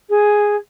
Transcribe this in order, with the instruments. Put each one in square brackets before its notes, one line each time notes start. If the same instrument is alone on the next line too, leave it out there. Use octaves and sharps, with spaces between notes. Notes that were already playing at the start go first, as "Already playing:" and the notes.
[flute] G#4